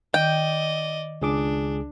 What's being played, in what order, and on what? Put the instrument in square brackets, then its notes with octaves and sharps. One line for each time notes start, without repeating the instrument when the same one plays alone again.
[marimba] D#3 [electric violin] D5 D#5 [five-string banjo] G5
[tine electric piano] C#2 G#4 D6 [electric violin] D4